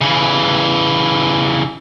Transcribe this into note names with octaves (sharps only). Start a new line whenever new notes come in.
C#3 E3